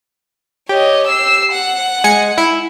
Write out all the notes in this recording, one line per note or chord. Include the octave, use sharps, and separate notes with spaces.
G4 C#5 D#5
E6 C7
F#5
G#3 G#5 C#7
E4